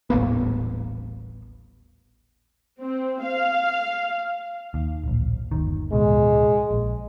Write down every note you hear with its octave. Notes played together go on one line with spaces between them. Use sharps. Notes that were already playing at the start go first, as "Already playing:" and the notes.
D#1 A1 A#3 B3
C4
F5
D#2
D1 A#1
G1 D#2 D#3
D1 C#2 B2 G#3
A#1